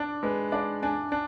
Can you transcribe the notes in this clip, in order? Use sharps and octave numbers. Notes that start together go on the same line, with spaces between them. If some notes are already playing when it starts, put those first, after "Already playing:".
Already playing: D4 D5
G#3 B4
D4 D5
D4 G#5
D4